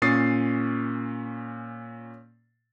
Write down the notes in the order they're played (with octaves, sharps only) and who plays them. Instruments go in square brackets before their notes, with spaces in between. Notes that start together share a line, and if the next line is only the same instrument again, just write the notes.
[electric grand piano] A#2 C#4 C#6 D#6 A6 C7